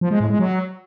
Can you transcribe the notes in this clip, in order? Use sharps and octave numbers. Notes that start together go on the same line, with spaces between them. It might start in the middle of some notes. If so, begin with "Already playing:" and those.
F3
G#3
A2
G#3
F#3